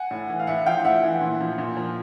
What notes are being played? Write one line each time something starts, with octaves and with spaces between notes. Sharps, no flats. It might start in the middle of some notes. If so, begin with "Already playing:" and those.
Already playing: F#5 G#5
A2
E3
F5
A2 E5 F#5
F3 F5 G5
A2 E5 F#5
E3
A#2
F3
A#2
F3